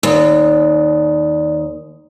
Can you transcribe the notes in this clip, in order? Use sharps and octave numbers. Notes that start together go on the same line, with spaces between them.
D#2 D5 D#6